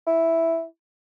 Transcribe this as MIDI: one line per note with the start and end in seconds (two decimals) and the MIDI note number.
0.07 0.64 64